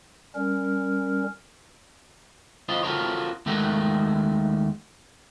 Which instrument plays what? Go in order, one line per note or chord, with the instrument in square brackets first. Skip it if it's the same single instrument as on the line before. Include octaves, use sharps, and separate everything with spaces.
[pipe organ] G3 C#4 A#4
[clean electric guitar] F4 C5 D#5
F4 F#4 A4 A#4 C5 C#5
D#2 G#3 A3 F#4 A#4 F#5